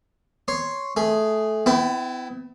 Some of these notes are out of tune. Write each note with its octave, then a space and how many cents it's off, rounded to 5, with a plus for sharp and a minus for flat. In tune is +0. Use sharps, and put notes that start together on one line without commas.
C#5 +0 C6 +0
A3 -20 G#4 +0
B3 +45 E4 +0 G5 +0